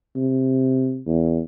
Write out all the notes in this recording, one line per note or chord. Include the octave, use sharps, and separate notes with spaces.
C3
E2